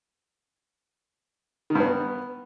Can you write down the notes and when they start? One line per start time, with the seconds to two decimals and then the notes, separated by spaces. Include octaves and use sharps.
1.70 D#3
1.75 G2
1.80 B3